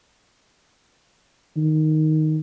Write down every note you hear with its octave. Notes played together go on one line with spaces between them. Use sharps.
D#3